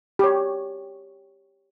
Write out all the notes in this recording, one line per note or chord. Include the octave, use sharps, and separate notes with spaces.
G4 C#5